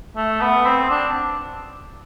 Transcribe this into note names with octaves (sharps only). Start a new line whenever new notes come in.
A3
B3
C4
D4